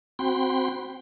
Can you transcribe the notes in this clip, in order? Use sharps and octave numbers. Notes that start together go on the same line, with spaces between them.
C4 F#4 G5 B5 C6